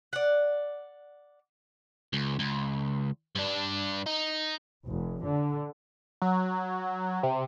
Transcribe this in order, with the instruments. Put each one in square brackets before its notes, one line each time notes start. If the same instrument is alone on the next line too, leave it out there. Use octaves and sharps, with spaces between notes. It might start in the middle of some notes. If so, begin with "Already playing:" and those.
[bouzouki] D5 F#5
[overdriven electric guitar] C#2
C#2
G2 D4
D#4
[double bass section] F1
D3
[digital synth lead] F#3
C3